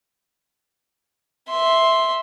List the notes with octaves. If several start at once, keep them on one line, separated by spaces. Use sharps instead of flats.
E5 C6